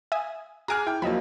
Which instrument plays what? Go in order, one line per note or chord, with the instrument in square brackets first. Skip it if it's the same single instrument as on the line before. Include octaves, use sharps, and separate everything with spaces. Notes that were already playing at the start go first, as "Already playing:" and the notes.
[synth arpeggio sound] E5 G#5 D#6
[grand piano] G#4 G#5 F6 [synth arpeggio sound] A#5 D6 F#6
[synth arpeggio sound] E4 [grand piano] G5
[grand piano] F3 F#3 A#3 [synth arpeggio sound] D#5 E5 B5